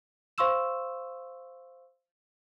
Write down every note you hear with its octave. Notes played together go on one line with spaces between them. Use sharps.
C5 F5 C6 C#6 E6 E7